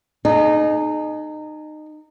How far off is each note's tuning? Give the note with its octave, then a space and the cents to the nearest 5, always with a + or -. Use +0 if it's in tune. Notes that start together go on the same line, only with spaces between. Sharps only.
D#4 -25 G#4 +35